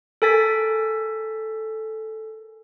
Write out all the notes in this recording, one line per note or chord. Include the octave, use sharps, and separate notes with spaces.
A4 A#4 G#5 A6 B6